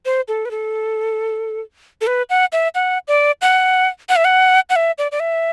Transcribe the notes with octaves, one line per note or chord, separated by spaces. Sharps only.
C5
A4
B4
A4
A4
B4
F#5
E5
F#5
D5
F#5
F#5
E5
F#5
F#5
E5
D5
D5
E5